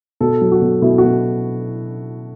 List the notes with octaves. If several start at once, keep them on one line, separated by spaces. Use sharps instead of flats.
B2 A4
F#3
F#4
B2
B2 E4
F#4
B2